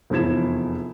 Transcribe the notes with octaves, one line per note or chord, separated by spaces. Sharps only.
F1 E2 F3 E4 G#6 E7